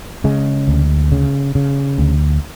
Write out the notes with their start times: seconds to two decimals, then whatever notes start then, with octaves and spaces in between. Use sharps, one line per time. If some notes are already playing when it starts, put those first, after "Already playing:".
0.24 C#3 G#3
0.68 D2
1.12 C#3
1.55 C#3
1.98 D2